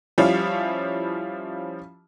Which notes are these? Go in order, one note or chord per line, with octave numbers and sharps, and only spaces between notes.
F3 G3 C#4 E4 F4